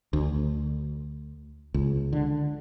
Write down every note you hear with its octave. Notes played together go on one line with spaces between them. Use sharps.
D2
C#2
D3